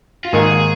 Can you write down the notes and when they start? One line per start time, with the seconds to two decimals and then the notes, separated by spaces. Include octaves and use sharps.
0.25 F4
0.32 G#2 D#3 A#3 D#4 G#4